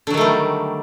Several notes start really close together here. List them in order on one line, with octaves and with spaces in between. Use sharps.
D3 F#3 D#3 A3 G3